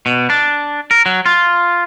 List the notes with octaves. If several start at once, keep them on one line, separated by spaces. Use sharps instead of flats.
B2
D4
A#4
F#3
F4